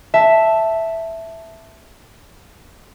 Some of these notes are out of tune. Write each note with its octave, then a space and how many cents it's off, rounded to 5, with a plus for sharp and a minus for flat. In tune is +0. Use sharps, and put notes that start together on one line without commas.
E5 +0 A5 +0